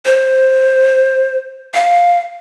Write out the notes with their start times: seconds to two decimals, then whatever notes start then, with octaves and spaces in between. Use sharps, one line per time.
0.05 C5
1.74 F5